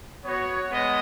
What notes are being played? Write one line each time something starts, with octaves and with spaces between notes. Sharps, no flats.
B3 F#4 C#5
G#3 B3 D#5